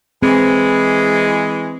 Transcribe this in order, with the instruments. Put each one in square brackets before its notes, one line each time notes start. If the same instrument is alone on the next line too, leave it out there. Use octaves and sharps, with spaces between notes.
[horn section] E3 G#3 [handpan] C4